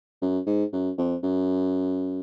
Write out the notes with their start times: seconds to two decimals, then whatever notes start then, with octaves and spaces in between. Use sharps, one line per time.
0.21 F#2
0.47 G#2
0.73 F#2
0.98 F2
1.23 F#2